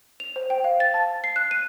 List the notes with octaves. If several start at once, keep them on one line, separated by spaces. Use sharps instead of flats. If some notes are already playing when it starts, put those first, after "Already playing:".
F7
C5
G5
F5
A6
A5
C7
F#6
D#7